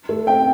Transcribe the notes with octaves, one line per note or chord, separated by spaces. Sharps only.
A3
C4 G5